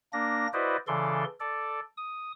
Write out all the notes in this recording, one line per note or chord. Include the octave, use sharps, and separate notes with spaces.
A#3 D4 A#6
E4 F#4 B4 C5 D5 D#5
C#3 E3 A4 D5 C6
A4 D5
D#6